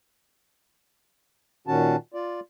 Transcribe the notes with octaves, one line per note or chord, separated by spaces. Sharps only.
A#2 D#3 C#4 F#4 A5
F4 D5